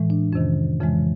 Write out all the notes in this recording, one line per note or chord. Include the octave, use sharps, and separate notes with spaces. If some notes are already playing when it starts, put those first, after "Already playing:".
Already playing: A2 E3 G#3
D4
F2 C3 D#3 C#4
F2 C#3 E3 G#3